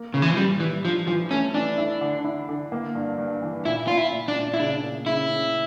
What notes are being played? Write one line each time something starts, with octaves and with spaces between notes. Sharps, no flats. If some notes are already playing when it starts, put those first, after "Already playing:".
Already playing: A#3
A2 C#3
E3
F3
A2 G3
E3 G3
F3 D4
E3 F3
A3 C#4
E3 D4
E4
D3
E4
D3
A#3
G2
G2
E3
A#2 E4
A#2 F4
E4
A#2
D4
A#2
E4
C#3 D4
A#3
C#3 E4
C#3